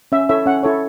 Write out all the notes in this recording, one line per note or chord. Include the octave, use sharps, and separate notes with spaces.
C#4 E5
E4 A4 C#5 E5
C#4 F#5
E4 A4 C#5